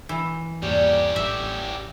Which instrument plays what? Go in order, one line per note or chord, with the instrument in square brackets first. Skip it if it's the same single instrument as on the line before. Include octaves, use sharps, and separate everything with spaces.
[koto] E3
[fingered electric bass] E2 G#2 A#3 [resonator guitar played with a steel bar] G3 [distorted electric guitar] C#4 G4
[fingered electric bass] A1 [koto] E5